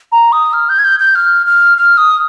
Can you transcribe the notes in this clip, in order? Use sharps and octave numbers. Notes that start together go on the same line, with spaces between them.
A#5
D#6
F6
G6
G#6
G6
G6
F6
F6
F6
D#6